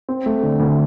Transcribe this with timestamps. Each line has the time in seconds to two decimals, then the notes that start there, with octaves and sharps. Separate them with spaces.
0.09 C4
0.26 A3
0.43 D3
0.60 D2